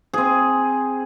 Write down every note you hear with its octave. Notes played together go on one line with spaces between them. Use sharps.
C4 G#4